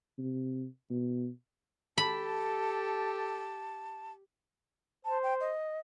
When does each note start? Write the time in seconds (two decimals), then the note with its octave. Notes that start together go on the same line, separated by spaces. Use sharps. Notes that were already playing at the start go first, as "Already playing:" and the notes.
0.18 C3
0.91 B2
1.98 G4 A4 A5 B5
5.05 C5 A5
5.23 G5
5.40 D#5